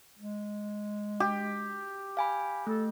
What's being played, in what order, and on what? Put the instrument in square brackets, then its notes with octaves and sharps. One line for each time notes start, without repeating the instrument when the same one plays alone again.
[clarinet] G#3
[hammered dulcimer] G4
[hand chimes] F5 G#5 B5
[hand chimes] A3 [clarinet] A4